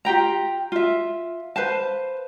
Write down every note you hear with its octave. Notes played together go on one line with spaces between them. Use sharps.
F4 G4 G5 A#5
F4 E5
B4 C5 F5 A5